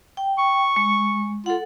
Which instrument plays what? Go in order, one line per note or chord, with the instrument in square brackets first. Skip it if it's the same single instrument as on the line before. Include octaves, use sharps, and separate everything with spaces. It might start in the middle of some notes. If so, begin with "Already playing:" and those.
[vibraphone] G5
[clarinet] C#6
[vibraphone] G#3
[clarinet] F4 [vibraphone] A4 F#5